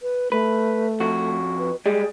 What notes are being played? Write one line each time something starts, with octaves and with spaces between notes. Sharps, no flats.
B4
A3 B4
F2 F#4
B4
G3 G#3 G#4